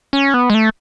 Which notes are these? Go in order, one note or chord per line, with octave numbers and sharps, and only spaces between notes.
C#4
B3
G#3
A3